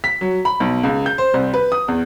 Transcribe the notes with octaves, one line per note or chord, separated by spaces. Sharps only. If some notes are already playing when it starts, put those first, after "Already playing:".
B6
F#3
B5
B1
C#2
G6
C5
C2
B4
D#6
E2